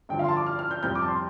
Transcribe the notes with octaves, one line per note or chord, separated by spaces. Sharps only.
G2 D3 F3 G5
F5
C6
A5
D6
F6
F6
G6
F2 C3 G3 G6
D6
A5
C6